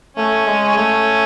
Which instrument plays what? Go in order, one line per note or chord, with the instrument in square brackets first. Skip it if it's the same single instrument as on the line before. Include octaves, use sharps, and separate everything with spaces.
[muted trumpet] A3 [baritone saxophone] C#4
[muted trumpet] G#3
[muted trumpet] A3 [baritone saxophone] C#4